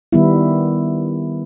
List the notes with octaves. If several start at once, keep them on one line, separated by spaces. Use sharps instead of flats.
D#3 G3 B3 E4